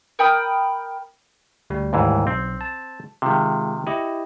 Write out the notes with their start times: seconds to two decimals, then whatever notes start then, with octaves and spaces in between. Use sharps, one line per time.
0.19 A#4 G5 B5 D#6
1.70 D2 G3
1.93 D#2 G#2 E3
2.27 B1 C4
2.61 A5
3.22 C3 D#3 G#3 F4
3.87 E4 G4 D#5